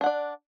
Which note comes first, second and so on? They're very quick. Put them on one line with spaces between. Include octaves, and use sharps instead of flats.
D4 F#5 D5